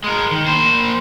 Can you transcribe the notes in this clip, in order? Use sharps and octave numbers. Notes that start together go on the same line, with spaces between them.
G#3 A#4
D#3
A#3 C5